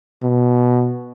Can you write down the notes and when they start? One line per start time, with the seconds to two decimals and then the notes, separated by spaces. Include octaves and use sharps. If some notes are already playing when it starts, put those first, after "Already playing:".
0.23 B2